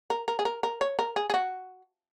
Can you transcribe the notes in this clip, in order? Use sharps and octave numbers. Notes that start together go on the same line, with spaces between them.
A#4
A#4
G#4
A#4
A#4
C#5
A#4
G#4
G#4
F#4